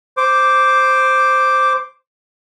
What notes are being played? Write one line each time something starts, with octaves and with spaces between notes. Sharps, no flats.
C5 D6